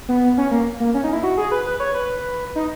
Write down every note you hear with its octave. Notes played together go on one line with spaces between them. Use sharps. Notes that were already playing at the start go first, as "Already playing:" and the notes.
B3
C#4
A#3
A#3
C#4
D#4
E4
F#4
G#4
B4
B4
C#5
B4
D#4